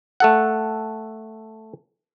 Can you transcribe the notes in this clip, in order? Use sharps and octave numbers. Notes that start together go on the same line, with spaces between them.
A3 A4 F#5